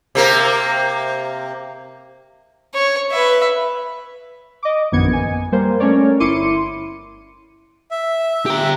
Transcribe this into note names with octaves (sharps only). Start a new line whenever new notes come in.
C3 A#3 A#4
C#5
B4 E5
D#5 D6
A#1 F#2 D#3 B3 G#6 C#7
G#5
G3 A#3 A#4 C5
A3 C#4 A#4 C#5 D5
G1 E4 C6 D6 C#7 D#7
E5
G4 A#5